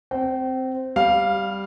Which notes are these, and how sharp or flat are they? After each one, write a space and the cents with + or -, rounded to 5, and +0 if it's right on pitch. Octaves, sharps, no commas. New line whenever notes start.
C4 +0 G5 -35
G3 +0 F5 +0